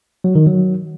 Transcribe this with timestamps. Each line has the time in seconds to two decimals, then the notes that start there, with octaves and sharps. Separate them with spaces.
0.24 F#3
0.35 D#3
0.46 F#3